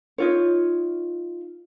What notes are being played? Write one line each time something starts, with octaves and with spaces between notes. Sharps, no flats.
D#4 F4 C#5